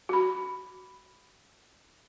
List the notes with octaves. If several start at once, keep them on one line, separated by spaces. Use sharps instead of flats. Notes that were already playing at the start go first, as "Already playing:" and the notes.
F#4 B5